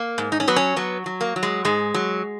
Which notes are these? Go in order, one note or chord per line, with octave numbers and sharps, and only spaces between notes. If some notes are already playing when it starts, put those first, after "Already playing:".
Already playing: A#3
G#2
D#4
C#4
F#3 B3
C#4
F#3 B3
F#3
A#3
F#3
G#3
G#2 G#3
F#3